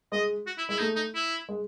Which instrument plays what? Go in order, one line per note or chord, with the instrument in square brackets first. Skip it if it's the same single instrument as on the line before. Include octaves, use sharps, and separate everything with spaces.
[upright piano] G#3 [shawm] D#5
[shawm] F#4
E4
[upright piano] G#3 [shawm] E4
[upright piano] A3 [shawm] D#4
[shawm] D#4
E4
[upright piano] G#3